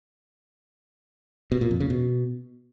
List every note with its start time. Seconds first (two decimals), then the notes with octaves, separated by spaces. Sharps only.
1.52 B2
1.61 A#2
1.71 F2
1.80 C#3
1.90 B2